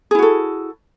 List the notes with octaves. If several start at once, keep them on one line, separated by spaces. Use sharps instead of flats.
E4 F#4 G#4 A4